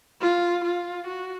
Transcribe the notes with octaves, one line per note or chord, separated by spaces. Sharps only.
F4
F4
F#4